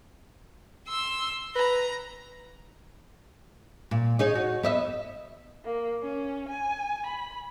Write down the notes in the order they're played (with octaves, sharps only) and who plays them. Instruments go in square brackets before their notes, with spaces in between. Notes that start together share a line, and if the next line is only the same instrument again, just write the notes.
[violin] C6 E6
[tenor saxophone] B4 [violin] A#5
[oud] A#2
D#4 G#4 C#5
F#4
B3 D#5 E5
[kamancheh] A#3
C#4
G#5
B5